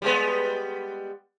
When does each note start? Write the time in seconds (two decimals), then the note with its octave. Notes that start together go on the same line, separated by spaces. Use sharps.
0.02 G3 G#3 B3